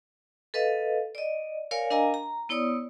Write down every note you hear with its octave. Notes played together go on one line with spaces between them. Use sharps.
A4 B4 D#5 F5
D5 D#5
A#4 C#5 D5 F5 G#5
D4 A#4 D#5 F5 G#5 A#5
A#5
B3 E4 C#5 D5 D#6